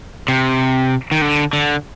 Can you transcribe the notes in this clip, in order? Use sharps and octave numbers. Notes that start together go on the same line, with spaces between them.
C3
D#3
D3
D3